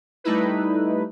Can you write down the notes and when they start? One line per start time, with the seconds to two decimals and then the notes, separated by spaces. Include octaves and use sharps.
0.24 G3 A3 D#4 E4 B4